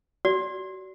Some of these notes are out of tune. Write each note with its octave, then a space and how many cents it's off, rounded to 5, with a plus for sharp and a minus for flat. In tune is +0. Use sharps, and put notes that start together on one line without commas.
F#4 +30 D5 -30